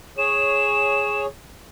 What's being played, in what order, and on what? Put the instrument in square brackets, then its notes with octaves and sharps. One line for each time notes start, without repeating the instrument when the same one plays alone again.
[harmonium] G#4 C#5 [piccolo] E7